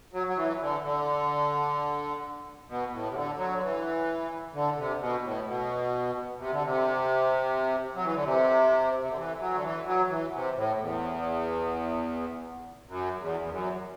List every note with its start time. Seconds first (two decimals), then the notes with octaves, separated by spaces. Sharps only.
0.13 F#3
0.27 F#3
0.36 E3
0.60 D3
0.83 D3
2.68 B2
2.92 A2
3.10 C3
3.15 D3
3.37 F#3
3.54 D3
3.62 E3
4.54 D3
4.76 C3
5.00 B2
5.24 A2
5.46 B2
6.39 C3
6.51 D3
6.63 C3
7.95 F#3
8.05 E3
8.14 D3
8.25 C3
9.01 C3
9.10 D3
9.17 E3
9.40 F#3
9.54 D3
9.63 E3
9.86 F#3
10.10 E3
10.33 C3
10.56 A2
10.79 E2
12.87 F#2
13.19 E2
13.40 E2
13.49 F#2